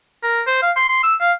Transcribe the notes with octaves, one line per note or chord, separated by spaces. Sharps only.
A#4
C5
F5
C6
C6
E6
F5